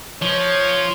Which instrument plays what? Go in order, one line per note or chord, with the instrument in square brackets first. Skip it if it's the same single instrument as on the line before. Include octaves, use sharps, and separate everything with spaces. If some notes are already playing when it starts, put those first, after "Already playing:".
[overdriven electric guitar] F3 [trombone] C#5